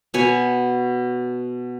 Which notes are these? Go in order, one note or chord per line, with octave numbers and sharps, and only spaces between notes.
B2 B4 C#5 G#5